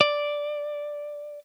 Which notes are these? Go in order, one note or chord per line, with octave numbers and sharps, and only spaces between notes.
D5